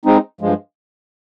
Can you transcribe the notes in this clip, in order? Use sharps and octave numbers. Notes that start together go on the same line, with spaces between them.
G#3 C4 D#4
G2 F3 G#3